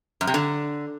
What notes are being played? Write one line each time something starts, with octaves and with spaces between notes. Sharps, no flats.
F#2
C3
D3